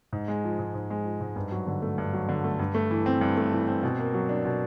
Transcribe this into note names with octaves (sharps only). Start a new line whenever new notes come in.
G#2
G#3
F3
G#2
G#2
G#3
F3
G#2
G2
F#3
D3
A3
G2
F#3
D3
A3
G2
A3
E3
C4
G2
A3
E3
C4
B2
A#3
F#3
D4
B2